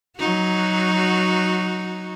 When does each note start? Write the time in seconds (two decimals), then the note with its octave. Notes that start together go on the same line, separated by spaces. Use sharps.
0.18 F#3 D#4 F#4